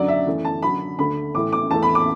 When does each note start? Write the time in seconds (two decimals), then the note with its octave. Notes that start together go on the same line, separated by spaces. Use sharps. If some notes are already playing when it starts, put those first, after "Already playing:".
Already playing: F#2 D3 F#3 D5
0.08 E5
0.27 F#2 E3 A3
0.45 A5
0.62 F#2 D3 F#3 B5
0.99 D2 D3 A3 B5
1.35 A2 E3 A3 D6
1.52 D6
1.71 E2 E3 A3 A5
1.83 B5
1.95 D6